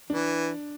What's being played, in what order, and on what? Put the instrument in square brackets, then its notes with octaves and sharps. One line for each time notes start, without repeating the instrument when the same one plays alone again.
[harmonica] E3 [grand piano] D4